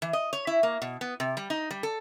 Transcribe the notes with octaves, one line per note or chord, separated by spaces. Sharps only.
E3
D#5
C#5
E4
A#3
B2
B3
C3
G3
D#4
G3
A4